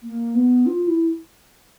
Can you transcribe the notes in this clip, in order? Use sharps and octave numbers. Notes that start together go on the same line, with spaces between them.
A#3
B3
F4
E4